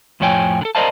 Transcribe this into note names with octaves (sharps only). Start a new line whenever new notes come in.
F2 A2 F3 C#5 G5 G#5
D3 A4
A#4 C5 D5 D#5 F5 A5